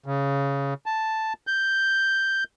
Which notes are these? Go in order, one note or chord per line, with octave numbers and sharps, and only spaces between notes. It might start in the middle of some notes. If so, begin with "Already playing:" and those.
C#3
A5
G6